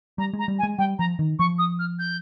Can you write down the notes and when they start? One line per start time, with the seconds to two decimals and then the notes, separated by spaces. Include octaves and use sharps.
0.18 G3 A#5
0.33 G#3
0.39 A#5
0.48 G3
0.59 G#5
0.63 G#3
0.78 G3 G5
0.99 F3 A#5
1.19 D#3
1.39 F3 C#6
1.59 D#6
1.79 F6
1.99 G6